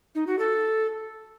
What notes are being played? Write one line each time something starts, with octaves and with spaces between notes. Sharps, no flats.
D#4
F#4
A4